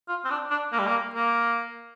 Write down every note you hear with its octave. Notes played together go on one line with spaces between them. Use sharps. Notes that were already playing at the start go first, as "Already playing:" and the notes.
F4
C4
D4
D4
A#3
G3
A#3
A#3